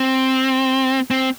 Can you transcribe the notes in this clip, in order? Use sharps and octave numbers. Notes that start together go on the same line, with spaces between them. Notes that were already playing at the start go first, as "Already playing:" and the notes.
Already playing: C4
C4